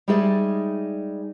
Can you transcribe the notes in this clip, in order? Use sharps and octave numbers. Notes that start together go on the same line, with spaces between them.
G3 G#3 D#4 G#4 D5 E5